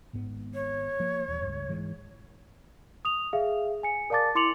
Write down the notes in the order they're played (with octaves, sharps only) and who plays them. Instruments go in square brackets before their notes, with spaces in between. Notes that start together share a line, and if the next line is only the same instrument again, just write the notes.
[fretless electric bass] G#1 G#2 B3
[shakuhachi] C#5
[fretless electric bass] F3 A#3
D#1 E2
C#2 G2
G#2 E3 G#3
[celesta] D#6 F7
G#4 E5 F5
G#5 C#7
A#4 D5 F5 A5 D6 A6
E4 C6 D6 C#7 F7 F#7